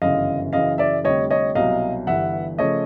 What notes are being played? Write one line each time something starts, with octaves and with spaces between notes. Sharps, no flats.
G1 F#2 C#3 E3 D#5 F5
F#2 C#3 E3 D#5 F5
D5 E5
F1 F2 D3 G3 C#5 D#5
C#5 D#5
C2 B2 F#3 D#5 F5
G1 G2 E3 E5 F#5
C#3 F3 A3 C#5 D#5